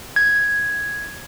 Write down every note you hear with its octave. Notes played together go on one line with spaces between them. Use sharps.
G#6